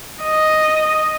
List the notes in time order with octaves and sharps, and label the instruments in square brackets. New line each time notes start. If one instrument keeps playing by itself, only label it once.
[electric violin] D#5